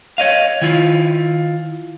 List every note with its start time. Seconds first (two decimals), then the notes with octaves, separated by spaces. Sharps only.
0.18 C#5 D#5 F5
0.62 D#3 E4 F4